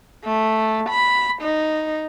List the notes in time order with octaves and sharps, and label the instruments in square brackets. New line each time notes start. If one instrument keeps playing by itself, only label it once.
[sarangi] A3
B5
D#4